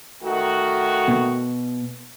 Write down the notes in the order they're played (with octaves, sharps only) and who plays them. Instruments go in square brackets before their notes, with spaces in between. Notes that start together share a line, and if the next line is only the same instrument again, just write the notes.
[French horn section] D#3 A3 F#4
[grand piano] B2